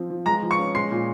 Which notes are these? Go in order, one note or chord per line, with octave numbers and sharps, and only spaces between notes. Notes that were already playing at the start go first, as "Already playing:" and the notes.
Already playing: F3 C4
F3
G#3 A#5 A#6
F3
C#6 C#7
C#4
G#3 C6 C7
A#2